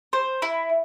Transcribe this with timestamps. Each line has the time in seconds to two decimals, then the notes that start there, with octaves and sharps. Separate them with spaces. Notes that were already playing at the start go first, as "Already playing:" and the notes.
0.13 C5
0.42 E4